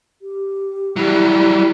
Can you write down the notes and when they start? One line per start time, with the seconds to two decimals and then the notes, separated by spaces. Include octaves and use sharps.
0.22 G4
0.96 F#3 G3 E4